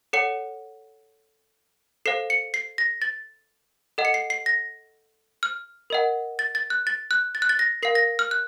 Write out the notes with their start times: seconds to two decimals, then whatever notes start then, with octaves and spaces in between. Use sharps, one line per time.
0.13 A4 C#5 F#5 C#7
2.06 A4 C5 F5 C7
2.30 C#7
2.54 C7
2.78 A#6
3.02 A6
3.98 A4 D#5 F#5
4.05 C#7
4.14 C7
4.30 C7
4.46 A#6
5.43 F6
5.90 A#4 D#5 F#5
6.39 A6
6.55 A6
6.70 F#6
6.87 A6
7.11 F#6
7.35 A6
7.42 F#6
7.49 A6
7.59 A#6
7.83 A#4 F5 C7
7.95 A#6
8.19 F6
8.31 F#6